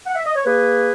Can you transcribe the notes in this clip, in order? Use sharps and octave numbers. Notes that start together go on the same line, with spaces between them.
F#5
E5
D#5
C#5
A#3 G#4 B4